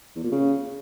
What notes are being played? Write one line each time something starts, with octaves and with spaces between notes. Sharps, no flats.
E2
A#2
C#3